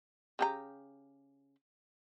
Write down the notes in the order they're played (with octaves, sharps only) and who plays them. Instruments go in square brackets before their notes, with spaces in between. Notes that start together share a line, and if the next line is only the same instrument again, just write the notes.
[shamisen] C#3 G4 A#5